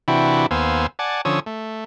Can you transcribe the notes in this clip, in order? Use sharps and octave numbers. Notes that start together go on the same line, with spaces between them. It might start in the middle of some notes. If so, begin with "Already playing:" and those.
C3 E3 D4 E4 F#4 G4
D#2 B3 C5 F5 G#5 E6
D5 F#5 G#5 A5
D3 F3 C#4 C#5 D#6 E6
A3